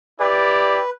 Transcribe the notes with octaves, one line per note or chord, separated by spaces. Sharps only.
E4 G4 B4 D5